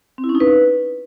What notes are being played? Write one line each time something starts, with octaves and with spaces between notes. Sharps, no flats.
C4
E4
C#4
D#4
B4